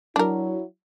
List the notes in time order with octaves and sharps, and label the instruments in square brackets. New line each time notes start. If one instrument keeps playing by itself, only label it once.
[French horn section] F#3 E4 [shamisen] D4 A#4